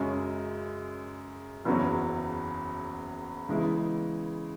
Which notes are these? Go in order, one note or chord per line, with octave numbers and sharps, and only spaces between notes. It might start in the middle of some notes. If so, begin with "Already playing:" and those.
Already playing: F#2 C#3 G#3 C#4
F#1 E2 C#3 F#3 C#4
C#3 E3 G#3 B3 E4